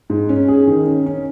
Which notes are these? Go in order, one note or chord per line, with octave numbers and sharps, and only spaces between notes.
G#2
C#4
G#4
D#3
C#4
C#4